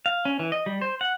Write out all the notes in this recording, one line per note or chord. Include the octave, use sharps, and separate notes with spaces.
F5
C#4
E3
D#5
G3
C5
F#5